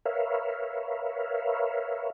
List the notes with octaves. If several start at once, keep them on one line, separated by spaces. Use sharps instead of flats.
A#4 B4 C#5 E5 F5